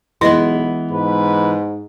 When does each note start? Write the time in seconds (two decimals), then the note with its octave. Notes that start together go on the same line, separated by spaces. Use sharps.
0.21 B1 E3 G#3 B3 E4 D#5
0.91 G#2 B4